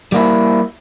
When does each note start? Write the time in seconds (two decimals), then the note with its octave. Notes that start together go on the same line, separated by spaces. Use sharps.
0.12 G3 A#3 E4